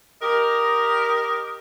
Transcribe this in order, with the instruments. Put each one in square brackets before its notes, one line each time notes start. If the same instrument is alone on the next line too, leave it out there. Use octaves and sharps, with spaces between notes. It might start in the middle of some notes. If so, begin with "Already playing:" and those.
[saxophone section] G4 A#4 [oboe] D#5